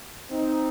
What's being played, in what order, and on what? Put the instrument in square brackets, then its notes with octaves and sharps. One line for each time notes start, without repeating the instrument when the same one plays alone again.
[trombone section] C4 D#4